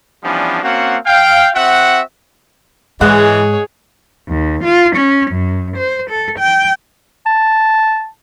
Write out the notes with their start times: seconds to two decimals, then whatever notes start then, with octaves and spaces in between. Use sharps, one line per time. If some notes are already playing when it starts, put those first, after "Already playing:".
0.23 E3 F3 G3 B3 C#4 D4
0.63 A#3 C4 C#4 F#4 F5 F#5
1.06 F5 G5
1.55 C4 F#4 E5 F#5
3.01 G#2 E3 G#3 G#4 C#5 D#5 F#5
4.28 D#2
4.64 F4
4.97 C#4
5.31 F#2
5.77 C5
6.10 A4
6.39 G5
7.26 A5